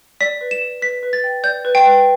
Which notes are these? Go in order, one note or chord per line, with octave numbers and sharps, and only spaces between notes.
D5 B6
B4
E7
D5
B4 B6
B4
A6
G5
D5 G6
B4
G5
B4